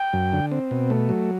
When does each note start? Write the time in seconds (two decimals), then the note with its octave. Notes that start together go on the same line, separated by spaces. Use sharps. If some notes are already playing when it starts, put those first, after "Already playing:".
Already playing: G5
0.13 F#2
0.33 D3
0.52 C4
0.71 B2
0.90 A3
1.09 F#3